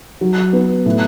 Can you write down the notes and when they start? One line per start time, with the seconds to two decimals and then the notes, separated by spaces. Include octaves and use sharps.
0.21 F#3
0.53 B3
0.86 A2